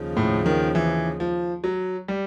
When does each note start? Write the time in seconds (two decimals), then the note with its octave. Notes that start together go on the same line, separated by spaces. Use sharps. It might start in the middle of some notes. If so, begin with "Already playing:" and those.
Already playing: D#2 C#3 F3
0.17 A2
0.46 D#3
0.75 E3
1.20 F3
1.64 F#3
2.08 G3